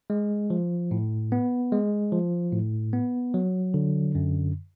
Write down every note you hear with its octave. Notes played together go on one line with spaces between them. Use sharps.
G#3
F3
A2
B3
G#3
F3
A2
B3
F#3
D3
F#2